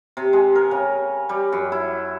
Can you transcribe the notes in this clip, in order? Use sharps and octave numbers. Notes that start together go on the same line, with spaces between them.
C3
G#3
A#4
C#3
G3
F#2
E4